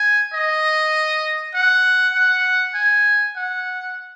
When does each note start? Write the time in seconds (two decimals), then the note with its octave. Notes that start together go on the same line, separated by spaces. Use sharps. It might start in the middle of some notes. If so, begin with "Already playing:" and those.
Already playing: G#5
0.34 D#5
1.55 F#5
2.14 F#5
2.75 G#5
3.36 F#5